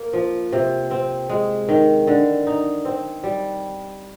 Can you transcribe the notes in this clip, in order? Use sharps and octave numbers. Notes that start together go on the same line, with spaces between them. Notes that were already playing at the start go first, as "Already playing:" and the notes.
Already playing: A#3
F3
C3
C4
G#3
D#3
D3
D#4
C4
G3